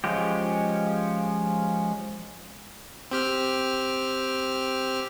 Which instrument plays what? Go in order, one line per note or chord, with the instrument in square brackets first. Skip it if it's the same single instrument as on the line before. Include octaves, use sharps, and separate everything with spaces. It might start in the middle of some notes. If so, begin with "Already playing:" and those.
[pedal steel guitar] F3 G#3 C#4 F4 G4
[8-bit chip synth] C4 G4 F6